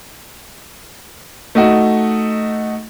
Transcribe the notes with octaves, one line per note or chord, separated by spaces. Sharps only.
A3 D#4 F#4